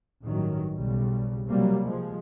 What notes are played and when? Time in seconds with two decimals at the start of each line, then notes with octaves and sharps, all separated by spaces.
0.25 A1 G2 D#3 F#3
0.74 B1 C#3 G3
1.46 C3 F#3 G3 A#3
1.85 F3 G#3